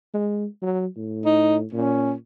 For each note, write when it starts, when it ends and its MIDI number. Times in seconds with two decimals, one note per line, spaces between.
0.14 0.46 56
0.62 0.86 54
0.96 1.65 45
1.25 1.57 63
1.73 2.15 46
1.73 2.12 61